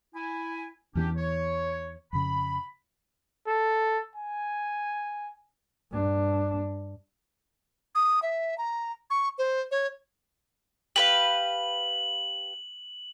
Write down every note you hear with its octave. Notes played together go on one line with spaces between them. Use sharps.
E4 G#5
E2 E3 B3 C#4 D4 G4
C#5
F2 C#3 B5
A4
G#5
G2 D4
D#6
E5
A#5
C#6
C5
C#5
G4 B4 F5 F#7